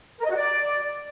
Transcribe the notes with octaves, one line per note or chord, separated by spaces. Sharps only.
A#4
D#5
F#4
D5